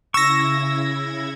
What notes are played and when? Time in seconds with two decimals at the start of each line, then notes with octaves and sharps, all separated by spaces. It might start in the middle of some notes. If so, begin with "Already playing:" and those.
0.14 C#3 E4 C#6 E6 G#6 A#6